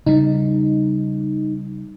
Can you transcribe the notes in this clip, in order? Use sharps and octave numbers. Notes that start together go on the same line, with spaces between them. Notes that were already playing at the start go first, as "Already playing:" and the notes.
C#3 G3 D#4